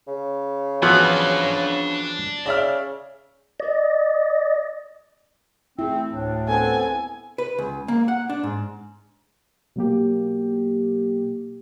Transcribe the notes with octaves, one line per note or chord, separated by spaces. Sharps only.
C#3
E3 F3 B3 D4 F#4 B5
C#3 D5 E5 F6
D5 D#5
A3 C4 E4 G#4
D2 A2 D4
B3 C4 A4 G#5
B4
C#2
A#3
F#5
D4
G#2
B2 F#3 A#3 G4